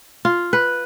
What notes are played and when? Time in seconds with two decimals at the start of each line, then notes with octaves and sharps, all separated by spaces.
0.25 F4
0.53 B4